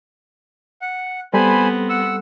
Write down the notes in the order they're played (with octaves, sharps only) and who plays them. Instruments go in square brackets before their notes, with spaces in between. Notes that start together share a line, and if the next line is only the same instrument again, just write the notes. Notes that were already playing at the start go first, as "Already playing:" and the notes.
[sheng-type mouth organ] F#5
[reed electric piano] G3 A4 [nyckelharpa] B3 C4 [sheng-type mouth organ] C5 G#5 B5
[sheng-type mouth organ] F#5 E6